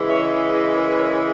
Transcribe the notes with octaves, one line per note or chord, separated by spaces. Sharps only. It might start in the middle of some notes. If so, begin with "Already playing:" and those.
Already playing: C#3 E3 G#3
C#5 E5
B4 D#5
A#4 C#5
B4
A#4 C#5